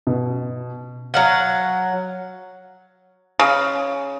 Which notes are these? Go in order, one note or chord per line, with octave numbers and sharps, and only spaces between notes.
B2
F#3 F5 F#5
C#3